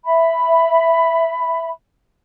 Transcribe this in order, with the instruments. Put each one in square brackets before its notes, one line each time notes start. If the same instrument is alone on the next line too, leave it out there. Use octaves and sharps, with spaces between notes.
[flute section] E5 B5